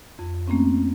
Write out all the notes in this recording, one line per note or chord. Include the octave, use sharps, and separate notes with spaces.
F2
A3 A#3 C4 C#4